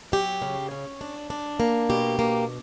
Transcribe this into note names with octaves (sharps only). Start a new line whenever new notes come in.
F#3 G4
C#3
C#4
D4
D4
A#3
B2 G4
A#3